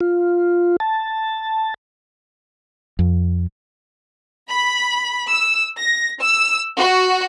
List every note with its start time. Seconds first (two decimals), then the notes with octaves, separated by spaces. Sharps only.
0.01 F4
0.80 A5
2.99 F2
4.49 B5
5.31 E6
5.78 A#6
6.20 E6
6.80 F#4